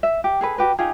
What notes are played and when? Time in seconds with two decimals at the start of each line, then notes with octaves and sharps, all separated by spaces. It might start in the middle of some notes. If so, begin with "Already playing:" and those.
0.03 E5
0.24 G4
0.41 G#4 A4 B4
0.58 F#4 G4 B4
0.79 D#4 F4 G4 G#4